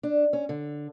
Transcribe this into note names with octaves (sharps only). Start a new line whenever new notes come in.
D4
C#4
D3